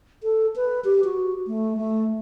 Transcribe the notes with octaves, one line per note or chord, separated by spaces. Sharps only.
A4
B4
G4
F#4
A3
A3